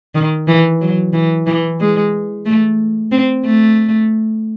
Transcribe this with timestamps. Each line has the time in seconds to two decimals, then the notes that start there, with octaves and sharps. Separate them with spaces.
0.15 D#3
0.47 E3
0.81 F#3
1.13 E3
1.46 E3
1.80 G#3
2.46 A3
3.12 C4
3.45 A3